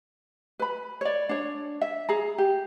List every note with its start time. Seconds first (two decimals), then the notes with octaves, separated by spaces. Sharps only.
0.59 B4 B5
1.01 C#5 D5
1.29 D4 C#5
1.81 E5
2.09 G#4 A#5
2.38 G4